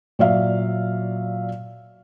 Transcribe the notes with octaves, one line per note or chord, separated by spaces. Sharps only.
A#2 F#3 D5 E5 F5